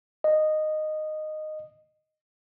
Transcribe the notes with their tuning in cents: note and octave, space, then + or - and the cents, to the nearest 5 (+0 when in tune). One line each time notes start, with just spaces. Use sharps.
D#5 -10